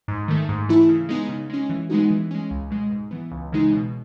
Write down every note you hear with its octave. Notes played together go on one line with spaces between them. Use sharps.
G#2
D#3 A3
G#2
E3 A3 E4
C#3
G#3 B3 D#4
C#3
G#3 C#4
E3
G#3 B3 D#4 F#4
E3
G#3 C#4
C#2
B2 G#3
G#2
E3 B3
C#2
C#3 E3 G#3 D#4
B2